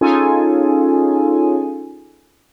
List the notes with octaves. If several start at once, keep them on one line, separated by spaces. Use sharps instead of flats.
C#4 D#4 F4 G#4 A4 G#5